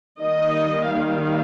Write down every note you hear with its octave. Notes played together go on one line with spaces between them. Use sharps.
D#3 G3 A#3 D#5
F5